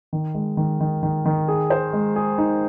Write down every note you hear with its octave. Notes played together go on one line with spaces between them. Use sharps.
D#3
G#3
D#3
D#3
D#3
D#3
G#4
C5
G#3
G#4
D#4